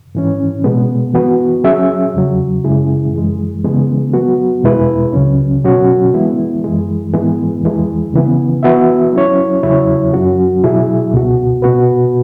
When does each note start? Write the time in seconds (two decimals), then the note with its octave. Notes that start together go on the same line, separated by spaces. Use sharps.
0.15 G#2 E3 C#4
0.64 B2 G#3 B3
1.14 E3 B3 F#4
1.64 F#3 C#4 G#4 E5
2.14 E2 C#3 F#3
2.64 F#2 C#3 G#3 E4 G#4
3.13 F#2 E3 G#3
3.64 C#3 E3 G#3 B3
4.14 F#3 B3 F#4
4.64 E2 B2 G#3 E4 B4
5.13 C#2 C#3 F#3 C#4
5.64 B2 F#3 C#4 F#4
6.14 E3 G#3 B3 E4
6.64 F#2 E3 G#3
7.13 G#2 E3 G#3 B3
7.63 E2 E3 G#3
8.14 C#3 E3 B3
8.63 E3 B3 F#4 E5
9.13 F#3 C#4 E4 C#5
9.63 E2 C#3 F#3 E4 C#5
10.14 F#2 F#3 C#4 F#4
10.64 B2 F#3 E4 G#4 E5
11.12 C#2 B2 B3 F#4
11.62 B2 B3 F#4 B4